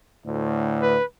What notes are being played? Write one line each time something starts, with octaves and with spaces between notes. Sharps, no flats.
D2 A2
B4